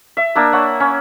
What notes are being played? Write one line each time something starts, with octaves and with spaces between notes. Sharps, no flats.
E5
A#3 D4 E6
C#5 F#5
C#4